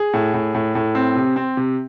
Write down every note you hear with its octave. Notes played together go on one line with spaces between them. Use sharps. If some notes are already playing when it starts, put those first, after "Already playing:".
Already playing: G#4
A2
A2
A2
A2
C4
C3
C4
C3